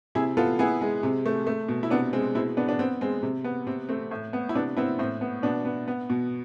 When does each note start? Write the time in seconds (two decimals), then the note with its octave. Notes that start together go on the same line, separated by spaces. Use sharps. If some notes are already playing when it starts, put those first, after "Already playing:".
0.15 C3 E4 G#4
0.37 B3 F4 A4
0.59 B3 E4 G#4
0.82 G#3
1.03 C3
1.26 A3
1.47 A3
1.69 B2
1.83 E4
1.91 C3 B3 D4
2.13 G#3 C4
2.35 B2 C4 E4
2.57 B3 D4
2.68 B3 D4
2.79 B3 C4
3.01 G#3 C4
3.23 C3
3.44 B3
3.67 C3 C4
3.89 A3 C4
4.11 A2
4.33 B3
4.49 E4
4.55 C3 B3 D4
4.77 B3 C4 E4
4.99 A2 C4
5.21 B3
5.43 B2 B3 D4
5.65 B3
5.88 B3
6.10 B2